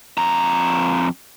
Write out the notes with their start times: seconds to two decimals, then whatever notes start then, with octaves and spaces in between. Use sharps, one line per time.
0.18 F2 A#5